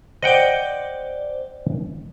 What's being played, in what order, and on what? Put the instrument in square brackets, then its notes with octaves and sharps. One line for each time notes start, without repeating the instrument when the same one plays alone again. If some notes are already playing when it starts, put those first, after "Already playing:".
[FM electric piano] C5 D5 [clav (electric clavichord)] D#5 F#5 G5